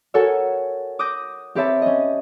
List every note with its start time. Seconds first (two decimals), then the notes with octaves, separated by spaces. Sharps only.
0.14 F#4 A4 A#4 C#5 G#5 E6
0.99 D6 D#6 F#6 G6 A#6
1.55 C4 G4 B4 C#5 E5 A5
1.82 C#4 D#5